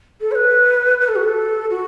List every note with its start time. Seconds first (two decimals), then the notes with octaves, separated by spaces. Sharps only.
0.21 A4
0.31 C#5
0.35 B4
1.00 B4
1.08 A4
1.15 F#4
1.23 A4
1.70 F#4